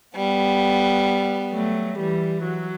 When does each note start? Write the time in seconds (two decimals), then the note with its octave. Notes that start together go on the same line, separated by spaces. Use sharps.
0.16 G3 B3
1.52 F#3 A3
1.98 E3 G3
2.44 F#3